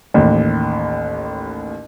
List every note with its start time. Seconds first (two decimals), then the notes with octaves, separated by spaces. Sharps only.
0.14 A1 D#2